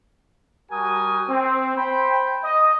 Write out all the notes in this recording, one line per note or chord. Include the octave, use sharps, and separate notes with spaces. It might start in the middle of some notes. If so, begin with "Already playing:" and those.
G3 F#4 A#4 G#5 A5 D#6
C4
C5 G5 B5
D#5